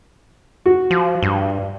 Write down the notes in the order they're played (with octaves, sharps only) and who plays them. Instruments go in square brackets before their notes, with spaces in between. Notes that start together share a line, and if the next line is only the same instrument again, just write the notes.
[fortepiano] F#4
[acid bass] F3
G2